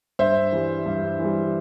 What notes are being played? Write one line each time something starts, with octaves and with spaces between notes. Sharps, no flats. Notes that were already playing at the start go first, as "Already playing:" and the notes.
G2 C5 E5
E3 G3
G2
E3 G3